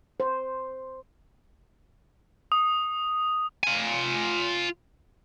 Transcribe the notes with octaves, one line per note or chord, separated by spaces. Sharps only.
C5
D#6
F4 G#5